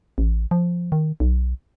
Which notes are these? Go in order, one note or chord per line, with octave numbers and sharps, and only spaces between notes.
A1
F3
D#3
B1